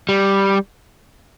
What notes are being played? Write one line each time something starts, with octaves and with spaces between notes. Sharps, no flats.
G3